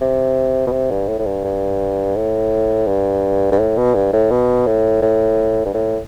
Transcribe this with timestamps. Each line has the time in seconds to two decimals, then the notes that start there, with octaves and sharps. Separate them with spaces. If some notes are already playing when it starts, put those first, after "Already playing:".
0.01 C3
0.67 B2
0.72 C3
0.91 G2
1.08 A2
1.19 A2
1.26 G2
1.45 G2
2.16 A2
2.87 G2
3.52 G2
3.59 A2
3.78 B2
3.95 G2
4.13 A2
4.31 B2
4.67 A2
5.02 A2
5.66 G2
5.74 A2